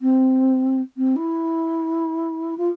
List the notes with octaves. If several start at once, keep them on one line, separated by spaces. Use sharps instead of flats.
C4
C4
E4
F4